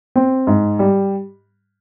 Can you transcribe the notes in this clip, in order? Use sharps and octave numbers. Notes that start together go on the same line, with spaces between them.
C4
G#2
G3